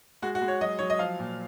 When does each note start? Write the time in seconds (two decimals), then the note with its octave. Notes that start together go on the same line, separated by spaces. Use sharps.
0.22 G#3 F#4
0.35 F#4
0.42 G#3
0.48 C#5
0.61 F#3 D#5
0.79 F#3 C#5
0.90 D#5
0.99 F3 F5
1.19 A#2